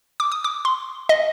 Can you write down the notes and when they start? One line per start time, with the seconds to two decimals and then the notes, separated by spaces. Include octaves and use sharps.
0.20 D6
0.32 D#6
0.44 D6
0.65 C6
1.09 D#5